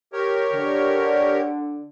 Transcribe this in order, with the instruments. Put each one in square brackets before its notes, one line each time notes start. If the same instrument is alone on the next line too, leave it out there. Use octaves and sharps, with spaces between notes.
[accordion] G4 A#4 C#5
[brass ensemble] D3